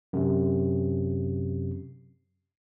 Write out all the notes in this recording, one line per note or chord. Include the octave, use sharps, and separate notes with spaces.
F#2 C3